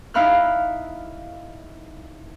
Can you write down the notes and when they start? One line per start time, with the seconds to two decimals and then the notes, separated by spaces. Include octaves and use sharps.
0.14 D#4 E4 F5 B5 F6 F#6